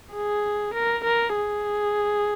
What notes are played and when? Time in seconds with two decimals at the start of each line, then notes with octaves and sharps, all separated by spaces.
0.14 G#4
0.74 A#4
1.05 A#4
1.36 G#4